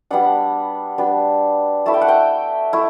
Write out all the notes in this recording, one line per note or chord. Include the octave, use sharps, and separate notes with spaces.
G3 B3 D4 F#5
G3 B3 D4
A3 E4 A5
G5
F#5
G5
A3 E4